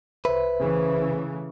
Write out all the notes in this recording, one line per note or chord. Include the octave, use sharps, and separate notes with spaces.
C2 B4 C5 E5
C#3 E3 A3